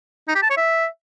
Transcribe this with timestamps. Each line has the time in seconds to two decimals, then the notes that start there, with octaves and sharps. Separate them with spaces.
0.28 D#4
0.35 G4
0.43 A5
0.50 C#5
0.57 E5